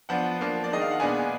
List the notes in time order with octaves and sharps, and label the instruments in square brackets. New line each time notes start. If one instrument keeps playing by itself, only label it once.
[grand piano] F3 B3 D4 F#5
F3 A#3 D4
D5
D#3 G#3 D4 D#5
F5
F#5
A#2 G#3 B3 D4 G#5